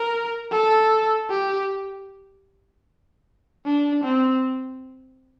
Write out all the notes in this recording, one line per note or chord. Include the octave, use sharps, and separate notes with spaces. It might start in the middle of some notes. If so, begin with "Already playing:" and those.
Already playing: A#4
A4
G4
D4
C4